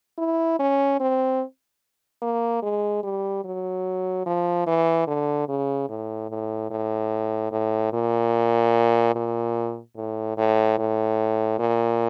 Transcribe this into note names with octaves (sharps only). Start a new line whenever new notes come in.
E4
C#4
C4
A#3
G#3
G3
F#3
F3
E3
D3
C#3
A2
A2
A2
A2
A#2
A#2
A2
A2
A2
A#2